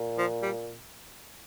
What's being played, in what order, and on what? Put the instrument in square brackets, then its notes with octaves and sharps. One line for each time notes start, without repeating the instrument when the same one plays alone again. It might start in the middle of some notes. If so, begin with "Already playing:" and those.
Already playing: [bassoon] A#2
[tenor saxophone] F3
G3